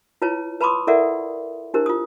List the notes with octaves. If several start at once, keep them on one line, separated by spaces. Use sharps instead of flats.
E4 F4 B4 C#5 A5
B4 A5 B5 C6 D6 D#6
E4 A4 A#4 D5 E5 F#5
D4 E4 G4 A#4 C5
F4 D#6